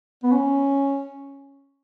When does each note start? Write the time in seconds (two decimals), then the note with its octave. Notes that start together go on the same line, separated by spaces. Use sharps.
0.24 B3
0.32 C#4